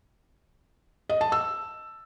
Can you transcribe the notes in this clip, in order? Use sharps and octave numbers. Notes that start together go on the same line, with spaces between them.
D#5
A5
E6